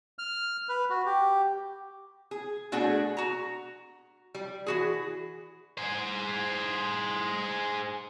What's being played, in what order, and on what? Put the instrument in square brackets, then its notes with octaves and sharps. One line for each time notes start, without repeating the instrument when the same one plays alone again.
[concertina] F6
B4
F#4
G4
[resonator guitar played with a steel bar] G#4
B2 A3 D4 F#4 G#4
F#4 A#5
G3
E3 F#4 G#4
[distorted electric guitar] G#4 C5